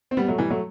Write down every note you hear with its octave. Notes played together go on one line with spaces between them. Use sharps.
C4
G3 B3
F#3 A3
E3 G3
F#3 A3